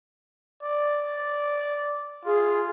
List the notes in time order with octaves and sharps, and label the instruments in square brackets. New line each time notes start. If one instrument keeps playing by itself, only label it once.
[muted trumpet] D5
[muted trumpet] F4 [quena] G#4